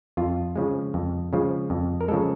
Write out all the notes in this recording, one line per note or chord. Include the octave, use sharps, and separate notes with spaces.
F2 F4
C#3 F3 G#3
F2
C#3 F3 G#3
F2
A#4
C#3 F3 G#3 A4